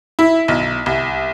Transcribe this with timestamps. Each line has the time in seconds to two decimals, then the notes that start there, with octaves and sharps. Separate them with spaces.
0.19 E4
0.48 B1
0.86 C2